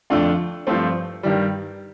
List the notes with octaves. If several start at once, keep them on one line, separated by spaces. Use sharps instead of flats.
F2 D3 A3 D4 F4
G2 F3 A3 C4
G2 D#3 G3